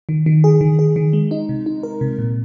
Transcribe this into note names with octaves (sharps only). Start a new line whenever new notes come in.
D#3
D#3
G#4
D#3
G#4
D#3
G#3
D#4
C3
D#4
A#4
C3
A#2